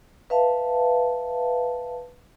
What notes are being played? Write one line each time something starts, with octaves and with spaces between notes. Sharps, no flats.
B4 E5 F5 A5